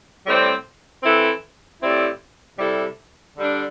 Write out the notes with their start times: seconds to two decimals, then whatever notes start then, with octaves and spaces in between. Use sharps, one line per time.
0.25 A2 G3 C4
1.03 E3 C4 E4 A4
1.81 A2 G3 C4 E4
2.58 C3 G3 E4 A4
3.36 D3 G3 D4